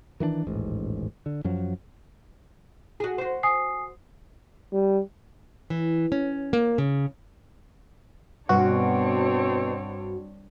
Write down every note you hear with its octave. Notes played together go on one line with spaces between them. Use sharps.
D#3 E3 A3 D4
D#1 A1 G#2
D3
F#2 F3 F#3
F#4 G#4
F#4 C5
G#5 D#6 C7
G3
E3
C#4
A#3
C#3
G2 B2 C4 D4 F#4 C#5